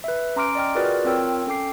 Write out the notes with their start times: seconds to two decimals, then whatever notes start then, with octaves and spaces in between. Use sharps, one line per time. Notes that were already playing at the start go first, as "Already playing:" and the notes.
0.04 B4 E5
0.36 C#4 A#5 C6 D6 F6 D7
0.55 D5 D#5 G5 F6
0.75 F4 F#4 G#4 A#4 B4 D5
1.05 C4 F4 A#4 C#5 G5 E6
1.47 C#4 A4 G5 D6 C7